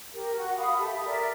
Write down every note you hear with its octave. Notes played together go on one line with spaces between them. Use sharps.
G4 A#4
F#4 F#5
F5 B5 D#6
G4 A4 E5
A#4 D5 E5